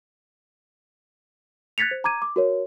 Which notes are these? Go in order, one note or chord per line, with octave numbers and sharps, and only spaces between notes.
F#6 G#6 A6 B6 C#7 F7
C5
A#5 D6 G#6 D#7
D6
F#4 A#4 C#5